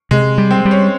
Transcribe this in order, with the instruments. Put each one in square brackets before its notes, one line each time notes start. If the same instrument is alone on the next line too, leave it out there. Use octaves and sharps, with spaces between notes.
[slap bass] C3 [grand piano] G#3
[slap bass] G3
[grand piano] C4
[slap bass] G3
[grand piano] C#4